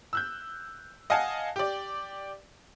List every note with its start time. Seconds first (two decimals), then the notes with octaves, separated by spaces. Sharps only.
0.13 E6 F#6 G6
1.10 D#5 F5 F#5 G#5 A5
1.56 G4 D5